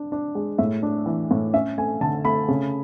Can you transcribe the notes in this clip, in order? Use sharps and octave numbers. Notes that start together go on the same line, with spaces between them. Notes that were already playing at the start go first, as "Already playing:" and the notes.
Already playing: D4
D4
G#3
A2 E5
D4
E3
A2
C#4 E5
A3 G#5
D3 A5
A3 B5
C#3